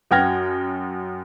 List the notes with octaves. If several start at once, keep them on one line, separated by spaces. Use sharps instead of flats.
F#2 F#4 G5 F6 G#6 A#6